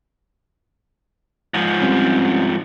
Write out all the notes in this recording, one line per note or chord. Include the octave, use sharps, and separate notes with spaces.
G#2 F3
G3 C4 C#4